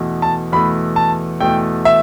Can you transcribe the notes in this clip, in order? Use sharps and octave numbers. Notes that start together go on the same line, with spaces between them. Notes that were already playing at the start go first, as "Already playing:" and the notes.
Already playing: E2 B2 A3
A5
E2 B2 A3 B5
A5
E2 B2 A3 G5
E5